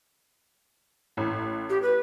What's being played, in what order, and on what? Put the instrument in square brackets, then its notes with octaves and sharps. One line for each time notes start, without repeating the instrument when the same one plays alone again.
[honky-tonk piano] A1
[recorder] G4
B4